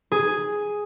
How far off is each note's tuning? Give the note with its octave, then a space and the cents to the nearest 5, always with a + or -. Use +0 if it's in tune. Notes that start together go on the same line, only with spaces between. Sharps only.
G#4 +0